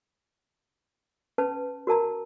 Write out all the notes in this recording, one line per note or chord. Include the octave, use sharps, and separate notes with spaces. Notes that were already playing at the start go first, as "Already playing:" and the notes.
C#4 B4 A5
F#4 A#4 A5 A#5